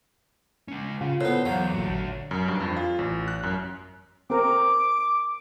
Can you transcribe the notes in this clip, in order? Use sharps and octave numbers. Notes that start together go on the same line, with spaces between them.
G#3 C#4
C#3 F4
A2 B3 C5 C#5
E2 F#3 F5 G6
A1 A#2 D3 F#4
F#2
G2
F2
F4
A1
F#6
F#2
C4 A#4 D6